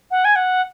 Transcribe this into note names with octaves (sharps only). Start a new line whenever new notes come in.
F#5
G#5
F#5